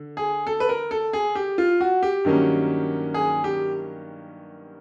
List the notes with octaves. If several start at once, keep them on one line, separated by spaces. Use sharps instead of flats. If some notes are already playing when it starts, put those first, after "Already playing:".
Already playing: D3
G#4
A4
B4
A#4
A4
G#4
G4
F4
F#4
G4
G2 D#3 F#3 A#3 C#4
G#4
G4